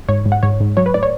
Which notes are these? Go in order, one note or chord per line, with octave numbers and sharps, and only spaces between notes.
G#2 C#5
G#2
F#5
G#2 C#5
G#2
F#3 C#5
B4
A2 D5
C#5